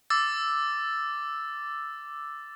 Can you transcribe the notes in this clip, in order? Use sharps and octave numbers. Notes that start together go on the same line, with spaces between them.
D6 E6 A6